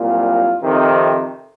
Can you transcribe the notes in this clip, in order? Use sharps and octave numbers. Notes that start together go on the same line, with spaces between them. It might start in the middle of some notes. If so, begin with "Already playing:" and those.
Already playing: C2 A#2 F#3 F4
F2 C3 D#3